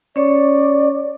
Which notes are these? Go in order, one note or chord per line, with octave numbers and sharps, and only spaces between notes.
C#4 C#5 D5 C#6